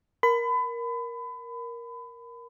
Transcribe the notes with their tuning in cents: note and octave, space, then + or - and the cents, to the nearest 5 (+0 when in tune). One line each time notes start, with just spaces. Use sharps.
A#4 +10 B5 +30